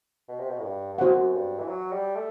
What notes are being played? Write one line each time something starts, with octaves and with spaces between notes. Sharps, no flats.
B2
C3
B2
A2
G2
G2
F#2 F#4 C5 F#5
G2
E3
F#3
G3
A3